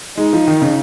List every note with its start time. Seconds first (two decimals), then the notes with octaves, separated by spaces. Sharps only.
0.17 G#3 D#4
0.33 F3
0.47 D#3
0.62 C#3